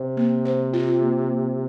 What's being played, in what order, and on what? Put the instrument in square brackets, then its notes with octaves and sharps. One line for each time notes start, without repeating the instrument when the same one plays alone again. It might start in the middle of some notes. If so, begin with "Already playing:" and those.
Already playing: [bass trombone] C3 [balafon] C5
[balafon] A#3
C5
F4
A#3
A#3